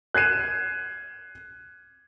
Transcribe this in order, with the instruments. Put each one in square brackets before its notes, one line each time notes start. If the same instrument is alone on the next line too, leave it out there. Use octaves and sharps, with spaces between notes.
[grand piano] F#6 G#6 C7 D#7 E7